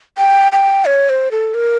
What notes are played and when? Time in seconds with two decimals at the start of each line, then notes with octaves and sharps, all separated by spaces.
0.18 G5
0.52 G5
0.86 C#5
1.09 C5
1.31 A4
1.54 A#4